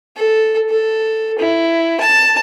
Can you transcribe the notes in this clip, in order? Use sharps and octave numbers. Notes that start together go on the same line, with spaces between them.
A4
A4
E4
A5